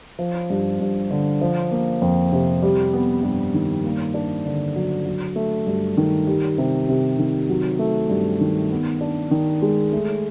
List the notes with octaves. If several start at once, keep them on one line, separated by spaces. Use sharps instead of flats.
F3
G2
G2
D3
F3
A#3
F2
C3
G3
B3
G2
D#3
A#3
D4
D3
F#3
F#3
A3
G2
D#3
G3
C3
C3
D#3
F#3
A3
G2
D#3
B3
D4
D#3
G#3
A3